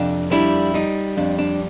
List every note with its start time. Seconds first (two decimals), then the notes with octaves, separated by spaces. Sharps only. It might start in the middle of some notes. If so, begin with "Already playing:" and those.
Already playing: F2 C3 D4
0.31 G3 D4 E4
0.74 G3 D#4
1.17 F2 D4
1.39 D4